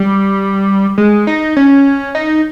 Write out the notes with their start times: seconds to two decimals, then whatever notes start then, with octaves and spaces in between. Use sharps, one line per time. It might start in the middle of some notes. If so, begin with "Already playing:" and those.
Already playing: G3
0.98 G#3
1.27 D#4
1.56 C#4
2.15 D#4